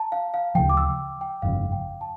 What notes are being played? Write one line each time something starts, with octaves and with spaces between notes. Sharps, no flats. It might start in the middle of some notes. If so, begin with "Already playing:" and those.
Already playing: A5 A#5
F5
F5
D2 C#3 F3 G5
D6
E6
G5
G1 F2 C#3 F5
G5
A5